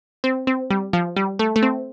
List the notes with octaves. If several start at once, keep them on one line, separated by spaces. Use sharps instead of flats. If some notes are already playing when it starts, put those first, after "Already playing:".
C4
C4
G3
F3
G3
A3
A3
C4